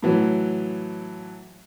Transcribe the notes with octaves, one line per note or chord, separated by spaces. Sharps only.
A2 E3 F#3